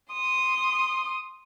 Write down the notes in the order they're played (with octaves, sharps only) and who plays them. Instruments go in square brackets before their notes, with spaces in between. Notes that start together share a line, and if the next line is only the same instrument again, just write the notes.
[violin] C6 D#6